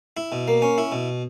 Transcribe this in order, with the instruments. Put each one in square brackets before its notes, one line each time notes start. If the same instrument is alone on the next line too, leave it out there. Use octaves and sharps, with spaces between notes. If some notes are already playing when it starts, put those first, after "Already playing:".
[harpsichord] E4
B2
A#3
C#4
E4
B2